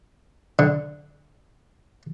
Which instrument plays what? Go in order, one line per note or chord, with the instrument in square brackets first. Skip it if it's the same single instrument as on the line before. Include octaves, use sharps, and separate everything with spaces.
[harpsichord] D3